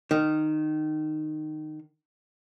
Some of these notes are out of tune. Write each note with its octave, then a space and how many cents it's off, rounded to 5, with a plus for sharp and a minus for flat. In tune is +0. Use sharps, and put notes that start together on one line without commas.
D#3 -15